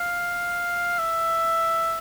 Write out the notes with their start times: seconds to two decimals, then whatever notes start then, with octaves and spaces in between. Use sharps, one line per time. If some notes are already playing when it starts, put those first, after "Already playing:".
Already playing: F5
0.99 E5